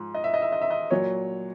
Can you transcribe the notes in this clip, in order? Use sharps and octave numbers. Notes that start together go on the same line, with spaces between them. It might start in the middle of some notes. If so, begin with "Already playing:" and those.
Already playing: G#2 F3
D#5
E5
D#5
E5
D#5
E5
D#5
A#2 F#3 C#5